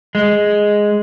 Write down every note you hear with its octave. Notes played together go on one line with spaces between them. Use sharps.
G#3